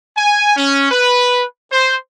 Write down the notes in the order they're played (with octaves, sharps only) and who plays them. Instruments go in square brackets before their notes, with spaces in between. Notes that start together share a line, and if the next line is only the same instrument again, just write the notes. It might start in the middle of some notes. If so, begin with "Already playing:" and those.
[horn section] G#5
C#4
B4
C5